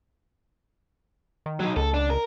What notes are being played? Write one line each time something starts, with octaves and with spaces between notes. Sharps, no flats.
D#3
F#3 D#4
C#2 A4
D4
A#4